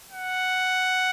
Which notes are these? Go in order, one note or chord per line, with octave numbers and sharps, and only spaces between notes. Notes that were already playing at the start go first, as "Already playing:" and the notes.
F#5